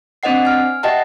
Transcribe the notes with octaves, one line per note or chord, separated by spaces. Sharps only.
C4 D4 C5 D#5 F#5 C7
G#5 F6
G4 D#5 E5 F#5 G5 A5